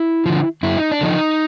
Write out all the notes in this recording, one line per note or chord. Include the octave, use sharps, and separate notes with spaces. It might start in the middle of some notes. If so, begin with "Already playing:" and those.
Already playing: E4
D3 F3
F#2 E4
D#4
D4
D3 F3 D#4